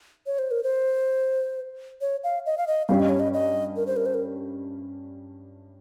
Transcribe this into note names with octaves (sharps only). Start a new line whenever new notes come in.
C#5
C5
A#4
C5
C#5
F5
D#5
F5
D#5
G2 G3 C#4 F5
D#5
C#5
D#5
D#5
A#4
C5
A#4
C5
A#4